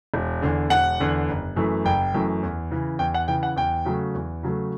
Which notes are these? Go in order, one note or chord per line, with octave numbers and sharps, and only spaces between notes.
E1
E2 D3
E1 F#5
E2 D3
F#1
F#2 E3 A3
F#1 G5
F#2 E3 A3
E2
C#3 E3
E2 G5
F#5
C#3 E3 G5
F#5
E2 G5
C#3 F#3 A3
E2
C#3 F#3 A3